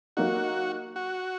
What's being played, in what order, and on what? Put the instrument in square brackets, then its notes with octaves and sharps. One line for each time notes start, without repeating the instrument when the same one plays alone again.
[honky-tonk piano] F#3 A#3 D#4 [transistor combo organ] F#4
[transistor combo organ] F#4